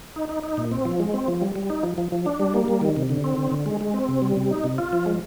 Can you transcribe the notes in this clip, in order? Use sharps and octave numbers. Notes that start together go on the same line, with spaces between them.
D#4
D#4
D#4
A#2
C4
F3
G#3
C4
F3
G3
G3
D#4
F3
F3
F3
D4
G3
A#3
G3
D#3
C3
D3
C4
D3
D3
G#3
G#3
C4
C3
G3
C3
D#4
C3
F4
F3
G#3